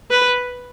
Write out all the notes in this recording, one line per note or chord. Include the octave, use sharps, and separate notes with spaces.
B4